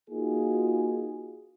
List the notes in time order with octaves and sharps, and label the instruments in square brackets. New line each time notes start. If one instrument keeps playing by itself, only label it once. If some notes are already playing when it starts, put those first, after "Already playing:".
[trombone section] A#3 D#4 F4 F#4 G#4